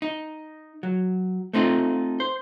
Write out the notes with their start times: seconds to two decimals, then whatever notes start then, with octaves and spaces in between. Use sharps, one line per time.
0.02 D#4
0.83 F#3
1.53 A3 C4 D#4 F4
2.20 C5